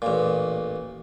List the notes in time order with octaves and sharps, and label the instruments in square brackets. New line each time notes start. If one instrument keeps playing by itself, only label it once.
[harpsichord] A1 A#2